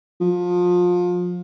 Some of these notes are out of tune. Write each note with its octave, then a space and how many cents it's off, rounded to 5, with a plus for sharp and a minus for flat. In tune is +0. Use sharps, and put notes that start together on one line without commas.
F3 +25